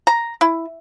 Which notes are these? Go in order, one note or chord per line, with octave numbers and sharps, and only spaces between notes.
A#5
E4